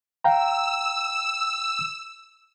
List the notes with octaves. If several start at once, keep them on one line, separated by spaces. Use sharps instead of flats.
F5 G5 A#5 E6